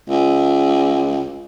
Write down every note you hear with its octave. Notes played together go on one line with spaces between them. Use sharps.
C#2